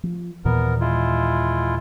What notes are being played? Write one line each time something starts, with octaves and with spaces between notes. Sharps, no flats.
F3
D#2 A#2 E3 B3 A#4
G#3 E4 F4